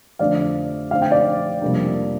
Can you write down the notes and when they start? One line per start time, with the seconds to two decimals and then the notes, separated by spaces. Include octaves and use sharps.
0.19 F2 D3 A3 C4 D5 F5
0.91 D3 A3 C4 F5
1.02 G5
1.11 D5 F5
1.61 F2 C3 G3 A#3 D4